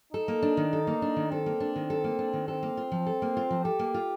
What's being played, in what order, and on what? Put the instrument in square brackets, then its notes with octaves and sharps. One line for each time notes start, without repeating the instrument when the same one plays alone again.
[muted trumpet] D#4 [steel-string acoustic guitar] A4
[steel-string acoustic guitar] A#3
D4
D#3
A4
A#3
D4
D#3
[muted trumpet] C4 [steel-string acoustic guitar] A4
[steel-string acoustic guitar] A#3
D4
D#3
A4
A#3
D4
D#3
[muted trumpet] C4 [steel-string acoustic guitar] A4
[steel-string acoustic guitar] A#3
F4
F3
A4
A#3
F4
F3
[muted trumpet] G4 [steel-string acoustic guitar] A4
[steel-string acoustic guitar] A#3
F4